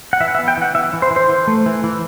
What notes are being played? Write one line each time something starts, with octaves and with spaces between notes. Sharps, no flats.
F#5
E3 E5
F#5
E5
B3
G5
E3 F#5
E3 E5
E3
C5
E3
C5
E3
A3
E3
E3